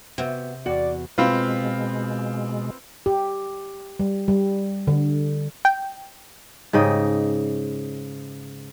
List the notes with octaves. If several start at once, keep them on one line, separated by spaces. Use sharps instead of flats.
C3 B3 F#4
E2 F#4 D5
B2 G#3 C4 F4 B4
G4
G3
G3
D3
G5
G#2 C#3 D#5 G5